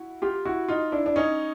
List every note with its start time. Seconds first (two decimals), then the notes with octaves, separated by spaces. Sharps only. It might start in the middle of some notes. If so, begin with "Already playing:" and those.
Already playing: E4 F#4
0.22 F4 G4
0.45 E4 F#4
0.68 D#4 F4
0.92 D4 E4
1.06 D4
1.16 C#4 D#4